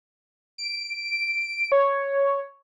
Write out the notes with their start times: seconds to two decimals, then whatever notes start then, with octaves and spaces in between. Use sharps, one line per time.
0.58 D7
1.72 C#5